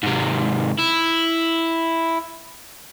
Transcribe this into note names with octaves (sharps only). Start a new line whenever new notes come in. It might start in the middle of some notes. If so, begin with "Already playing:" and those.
G#2 C3
E4